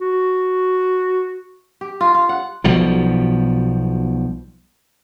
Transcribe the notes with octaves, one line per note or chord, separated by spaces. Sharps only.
F#4
G4
F4
F4
F#5
B1 B2 F3 G3